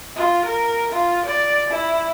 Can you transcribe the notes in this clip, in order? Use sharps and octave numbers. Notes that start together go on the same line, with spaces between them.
F4
A#4
F4
D5
E4